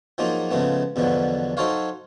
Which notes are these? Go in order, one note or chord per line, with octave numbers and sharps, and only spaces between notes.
F3 F#3 A#3 D#4 F4 G#4
C#3 F3 G#3 A3 B3
E2 B2 D3 F3 F#3
F#3 D#4 A4 C5 C#5 F5